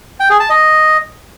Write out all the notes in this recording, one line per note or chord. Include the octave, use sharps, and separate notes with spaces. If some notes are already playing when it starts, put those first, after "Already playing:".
G5
G#4
A5
D#5